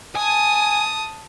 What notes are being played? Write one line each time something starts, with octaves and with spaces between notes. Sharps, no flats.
G#5 A5 D#6